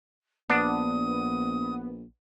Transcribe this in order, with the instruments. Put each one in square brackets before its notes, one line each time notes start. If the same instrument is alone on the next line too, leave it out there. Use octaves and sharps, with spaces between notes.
[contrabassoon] A#1 [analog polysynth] B3 [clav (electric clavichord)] D4 [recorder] D#6